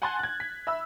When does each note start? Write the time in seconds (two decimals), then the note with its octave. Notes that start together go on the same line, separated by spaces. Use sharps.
0.02 F#5 G#5 A5 C6 F#6 A6
0.19 F#6 G#6
0.40 B6
0.67 E5 B5 E6